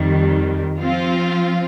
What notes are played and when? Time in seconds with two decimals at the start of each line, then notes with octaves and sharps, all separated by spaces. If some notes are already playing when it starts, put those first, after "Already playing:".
Already playing: F2 D#3 G3
0.81 F3 C4 F4